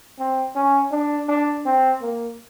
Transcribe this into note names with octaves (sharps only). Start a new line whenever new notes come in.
C4
C#4
D4
D4
C4
A#3